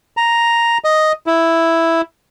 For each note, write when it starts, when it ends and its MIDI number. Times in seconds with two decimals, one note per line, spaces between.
0.17 0.78 82
0.84 1.12 75
1.27 2.01 64